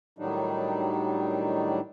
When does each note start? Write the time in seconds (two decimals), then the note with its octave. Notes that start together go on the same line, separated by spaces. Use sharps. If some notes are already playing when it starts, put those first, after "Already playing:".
0.19 A2 D#3 F#3 G3 D4 D#4